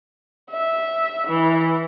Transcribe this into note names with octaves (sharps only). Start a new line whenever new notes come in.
E5
E3